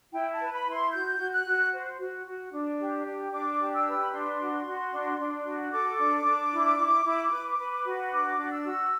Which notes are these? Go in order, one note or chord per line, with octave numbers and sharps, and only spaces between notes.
E4 G5
A5
B4
B5
E4
C6
F#4 G6
F#4
F#6
F#4
C5
F#4
F#4
D4
G4
D4
D4 D6
G4
E6
B4
B5
D4 C6
F#4
F#4
D4
D4
F#4
A4 D6
D4
D4
E4
E4
E4
B4
B4
F#4
D4 D6
D4
E6
F#4